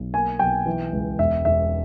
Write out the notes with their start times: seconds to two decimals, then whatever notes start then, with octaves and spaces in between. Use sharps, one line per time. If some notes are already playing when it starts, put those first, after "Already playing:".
Already playing: B1
0.13 A#3 G#5
0.39 B1 G5
0.66 E3
0.92 C#2
1.19 E1 E5
1.45 E1 E5